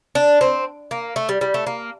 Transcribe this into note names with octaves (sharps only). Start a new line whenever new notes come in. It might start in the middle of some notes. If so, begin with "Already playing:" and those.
D4
C4
A#3
A3
G3
G3
A3
A#3